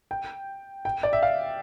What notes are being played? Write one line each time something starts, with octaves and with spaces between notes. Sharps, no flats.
G5
G5
D5
E5
F5